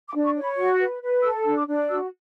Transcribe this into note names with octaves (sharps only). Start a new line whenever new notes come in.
D6
D4
C#6
C#5
B5
F#4 C#6
B4
B4
A4 E6
E6
D4
D6
D4
F#4 E6